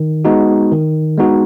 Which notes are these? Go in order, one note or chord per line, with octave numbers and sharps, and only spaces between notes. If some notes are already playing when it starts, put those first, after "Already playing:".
Already playing: D#3
G#3 B3 D#4 F#4
D#3
G#3 B3 D#4 F#4